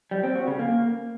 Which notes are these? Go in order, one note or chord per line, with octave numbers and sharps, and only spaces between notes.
G3
C4
F#4
C#3
A#3